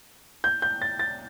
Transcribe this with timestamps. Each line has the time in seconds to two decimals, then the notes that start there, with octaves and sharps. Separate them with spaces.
0.44 G6
0.62 G6
0.82 A6
0.99 A6